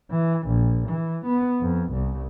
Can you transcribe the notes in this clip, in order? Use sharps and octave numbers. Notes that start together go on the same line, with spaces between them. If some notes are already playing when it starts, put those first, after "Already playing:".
E3
A#1
E3
B3
F2
C2